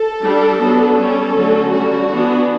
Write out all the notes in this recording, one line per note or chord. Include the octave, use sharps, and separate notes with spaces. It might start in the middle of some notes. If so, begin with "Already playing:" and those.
Already playing: A4
G3 D4
F#3 B3 D4
G3 C#4 A4
D3 F#3 A3 C#4
D3 G3 C#4 F#4
E3 B3 D4